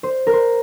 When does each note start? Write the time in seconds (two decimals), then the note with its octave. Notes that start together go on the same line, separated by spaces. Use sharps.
0.03 C5
0.27 A#4
0.33 C5